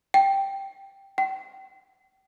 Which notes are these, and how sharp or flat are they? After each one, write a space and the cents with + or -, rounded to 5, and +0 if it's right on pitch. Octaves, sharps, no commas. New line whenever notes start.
G5 +0
G5 -40